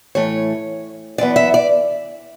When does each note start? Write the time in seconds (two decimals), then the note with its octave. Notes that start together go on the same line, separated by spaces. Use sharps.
0.15 A2 E3 A3 C#5
1.18 F#2 E3 B3 D5
1.36 E5
1.54 D5